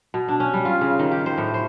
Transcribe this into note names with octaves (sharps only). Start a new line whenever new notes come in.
B2
D4
C#4
G3
F4
C#3
D#3
G4
C5
A2
C5